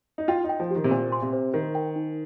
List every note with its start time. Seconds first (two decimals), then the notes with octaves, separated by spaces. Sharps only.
0.18 D#4
0.28 F4 G5
0.44 D#4
0.49 G5
0.60 F3
0.71 D#3 G4
0.84 C3
0.91 A#2 C5
1.12 C6
1.22 C3
1.33 C5
1.54 D#3 A#4
1.75 G5
1.96 D#4